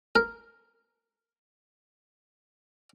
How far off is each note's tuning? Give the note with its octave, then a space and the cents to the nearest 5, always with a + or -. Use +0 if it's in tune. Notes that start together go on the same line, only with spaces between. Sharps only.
A#4 -5